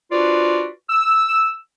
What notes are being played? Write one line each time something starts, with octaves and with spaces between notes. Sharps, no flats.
D4 F4 F#4 B4 C5 D5
E6